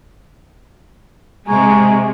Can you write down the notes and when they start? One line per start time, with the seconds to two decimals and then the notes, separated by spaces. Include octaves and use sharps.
1.48 C3 G#3 G#5 A#5 C#6